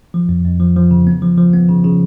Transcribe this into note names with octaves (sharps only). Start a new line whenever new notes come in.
F3
F2
F2
F3
F3
C#3
B3
F3
F3
B3
C#3
C#3